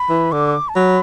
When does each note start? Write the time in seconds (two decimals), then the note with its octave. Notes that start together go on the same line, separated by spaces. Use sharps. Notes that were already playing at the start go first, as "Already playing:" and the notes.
Already playing: B5
0.10 E3
0.32 D3 D6
0.69 A5
0.75 F#3 B5